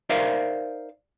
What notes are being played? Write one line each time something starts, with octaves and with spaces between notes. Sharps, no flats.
D#4 A#4 C5 D5 E5 F5